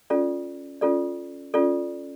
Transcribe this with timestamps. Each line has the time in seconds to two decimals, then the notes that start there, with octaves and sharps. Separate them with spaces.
0.10 C#4 F4 A4 D5
0.81 C#4 F4 A4 D5
1.54 C#4 F4 A4 D5